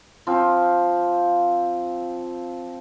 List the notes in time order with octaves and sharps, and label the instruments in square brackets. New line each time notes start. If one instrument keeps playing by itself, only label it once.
[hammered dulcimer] F3 C4